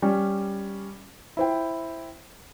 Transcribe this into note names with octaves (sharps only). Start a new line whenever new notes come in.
G3 C#4
E4 C5 G5